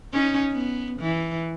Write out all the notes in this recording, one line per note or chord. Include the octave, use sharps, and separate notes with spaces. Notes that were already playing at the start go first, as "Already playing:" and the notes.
C#4 D#4
B3
E3